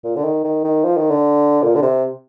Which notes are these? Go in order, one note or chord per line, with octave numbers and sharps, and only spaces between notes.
A#2
D3
D#3
D#3
D#3
F3
D#3
D3
A#2
D3
C3